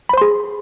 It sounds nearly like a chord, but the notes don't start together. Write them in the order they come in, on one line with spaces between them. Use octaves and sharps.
B5 C5 C6 G#4